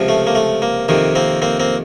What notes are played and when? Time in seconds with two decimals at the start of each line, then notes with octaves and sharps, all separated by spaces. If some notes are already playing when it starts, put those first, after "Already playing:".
Already playing: C#2 C3 F3
0.08 A3
0.27 A#3
0.35 A3
0.62 A#3
0.88 F2 C3 D#3 A#3
1.15 A#3 C4
1.42 A#3 C4
1.60 A#3 C4